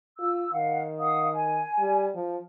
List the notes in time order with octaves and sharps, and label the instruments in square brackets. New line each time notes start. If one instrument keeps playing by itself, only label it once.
[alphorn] F4 [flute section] E6
[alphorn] D#3 [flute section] F5 F#5
[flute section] F5 F#5 D#6
G#5
[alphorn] G3
F3